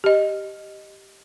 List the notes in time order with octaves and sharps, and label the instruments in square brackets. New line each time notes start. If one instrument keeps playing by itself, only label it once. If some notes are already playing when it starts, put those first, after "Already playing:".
[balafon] G4 D#5